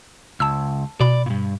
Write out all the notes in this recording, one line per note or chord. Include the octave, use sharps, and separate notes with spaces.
C#2 A5 E6
B2 D5 B5
G2 A#2